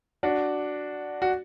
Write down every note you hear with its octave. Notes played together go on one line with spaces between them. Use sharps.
D4 F#4
F#4